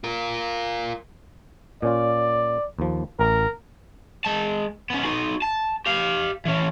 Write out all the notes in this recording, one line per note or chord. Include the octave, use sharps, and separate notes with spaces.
F4 A#4
A#2 C#4 F4 D5
D#2 F3
A1 A#4
G#3 A5
B3 C#4
D#4 F#4
A5
G4 F5
E3 C#4